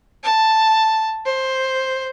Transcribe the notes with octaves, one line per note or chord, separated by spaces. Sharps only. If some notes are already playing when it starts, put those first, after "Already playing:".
A5
C5